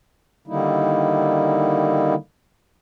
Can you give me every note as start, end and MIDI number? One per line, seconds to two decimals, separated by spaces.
0.47 2.15 50
0.47 2.15 51
0.47 2.15 55
0.47 2.15 58
0.47 2.15 63
0.47 2.15 64